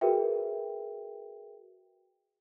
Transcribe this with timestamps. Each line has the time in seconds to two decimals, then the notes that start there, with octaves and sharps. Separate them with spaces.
0.01 F#4 G#4 A#4 B4 E5 G5